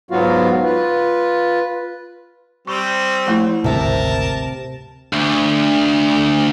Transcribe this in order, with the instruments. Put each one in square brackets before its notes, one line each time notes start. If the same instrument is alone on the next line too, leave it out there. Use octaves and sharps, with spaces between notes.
[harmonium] G#2 F#3 B3 F4 F#4 F5
F4 B4
[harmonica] G3 C4 [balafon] C#6
[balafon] F3 A3 E4
[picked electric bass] G#1 D2 [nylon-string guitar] C3 E5 [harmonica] A#4 A5
[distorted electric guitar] D2